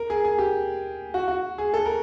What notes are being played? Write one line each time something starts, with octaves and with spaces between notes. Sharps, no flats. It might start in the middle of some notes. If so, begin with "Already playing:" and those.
Already playing: A#4
G#4
G#4
G4
F#4
F#4
G#4
A4
A#4